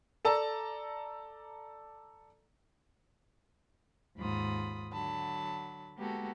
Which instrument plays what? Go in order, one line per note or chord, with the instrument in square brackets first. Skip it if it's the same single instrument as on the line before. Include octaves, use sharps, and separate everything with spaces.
[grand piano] A4 D5 A5 A#5 E6
[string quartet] D#2 G#2 F4 B5 D#6
D3 F#3 A5 B5
G#3 A#3 B3 F#4 G4 A4